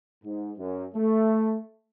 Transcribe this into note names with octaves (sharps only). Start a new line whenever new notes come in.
G#2
F#2
A3